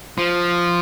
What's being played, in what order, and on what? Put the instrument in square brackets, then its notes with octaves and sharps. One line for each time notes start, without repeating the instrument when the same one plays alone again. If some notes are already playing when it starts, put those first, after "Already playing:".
[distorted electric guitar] F3